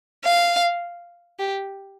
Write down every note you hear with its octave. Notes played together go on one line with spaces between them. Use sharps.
F5
G4